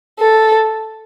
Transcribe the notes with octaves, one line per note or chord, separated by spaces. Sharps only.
A4